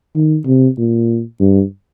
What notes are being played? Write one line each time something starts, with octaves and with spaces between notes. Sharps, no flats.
D#3
C3
A#2
G2